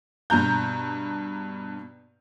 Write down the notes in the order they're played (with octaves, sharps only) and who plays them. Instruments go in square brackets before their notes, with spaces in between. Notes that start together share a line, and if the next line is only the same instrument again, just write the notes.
[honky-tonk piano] G2 B2 A#5 G6